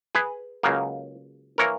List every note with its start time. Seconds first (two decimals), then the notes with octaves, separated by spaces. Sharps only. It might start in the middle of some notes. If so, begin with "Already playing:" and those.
0.15 G#4 B4
0.63 C#2 C#3 F#3 A#3
1.58 E3 A#3 A#4 C#5